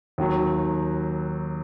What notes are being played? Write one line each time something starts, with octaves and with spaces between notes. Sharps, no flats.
D#2 D#3 F#3